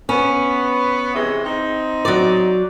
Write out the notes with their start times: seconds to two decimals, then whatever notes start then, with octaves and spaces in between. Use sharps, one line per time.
0.09 B3 C#4
1.15 C3 E3 G#3
1.44 C4 D#4
2.05 F#3 D5